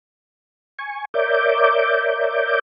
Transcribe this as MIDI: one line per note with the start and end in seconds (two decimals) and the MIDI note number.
0.79 1.05 80
0.79 1.05 85
1.14 2.59 70
1.14 2.59 73
1.14 2.59 74
1.14 2.59 76
1.14 2.59 86
1.14 2.59 91